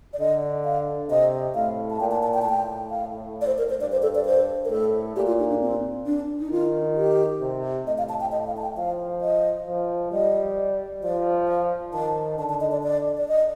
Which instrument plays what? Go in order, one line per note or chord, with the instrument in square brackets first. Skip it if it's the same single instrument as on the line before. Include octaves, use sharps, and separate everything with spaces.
[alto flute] D5
[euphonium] D3 [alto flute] D#5
[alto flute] F5
[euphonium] C3 [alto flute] D#5
[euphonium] A2 [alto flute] F5
[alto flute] A5
[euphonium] A#2 [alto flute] G5
[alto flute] A5
A5
G5
A5
[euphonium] A2 [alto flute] G5
[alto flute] F5
D5
C5
A#4
C5
[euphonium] G2 [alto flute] D5
[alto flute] C5
A4
D5
C5
A#4
[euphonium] A2 [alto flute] A4
[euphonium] A#2 [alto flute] G4
[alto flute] F4
D#4
D4
C4
D4
D#4
[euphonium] D#3 [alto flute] F4
[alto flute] G4
[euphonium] C3
[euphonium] A2 [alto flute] D#5
[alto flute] F5
A5
G5
D#5
F5
A5
G5
[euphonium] F3 [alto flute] F5
[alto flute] D#5
[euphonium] F3
[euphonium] G3 [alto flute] D#5
[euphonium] F3 [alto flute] D5
[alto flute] F5
[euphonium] D#3 [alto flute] A5
[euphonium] D3 [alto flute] A5
[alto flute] A5
D#5
D5
D5
D5
D#5